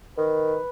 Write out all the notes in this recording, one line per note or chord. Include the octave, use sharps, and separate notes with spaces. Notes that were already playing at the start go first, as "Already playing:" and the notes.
D#3 B4